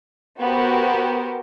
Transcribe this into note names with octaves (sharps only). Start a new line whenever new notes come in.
B3 F#4 G4 A#4 C5